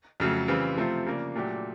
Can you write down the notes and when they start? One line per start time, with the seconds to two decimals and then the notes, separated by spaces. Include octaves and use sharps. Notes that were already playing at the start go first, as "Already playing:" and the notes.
0.20 F2 C#3 F#3 A3
0.48 C#3 E3 G3 C4 F4
0.77 C3 F3 A3 C4 F4
1.06 C#3 F3 A#3 D4
1.35 A#2 F#3 A3 D4 G4